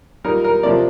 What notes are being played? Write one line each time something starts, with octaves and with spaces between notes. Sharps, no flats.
A#2 G3 A#3 D#4 A#4
A#4
C3 F3 A#3 D4 D5